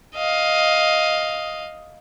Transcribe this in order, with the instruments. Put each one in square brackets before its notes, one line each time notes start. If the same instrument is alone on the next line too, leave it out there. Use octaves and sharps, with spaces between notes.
[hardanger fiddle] D#5 F5